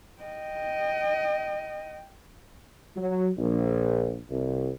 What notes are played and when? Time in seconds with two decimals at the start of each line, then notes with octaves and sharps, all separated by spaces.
0.23 D#5 G5
2.96 F#3
3.37 A#1
4.29 C2